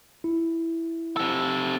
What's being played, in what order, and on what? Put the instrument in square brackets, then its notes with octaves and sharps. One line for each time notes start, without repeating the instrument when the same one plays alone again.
[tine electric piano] E4
[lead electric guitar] C3 A4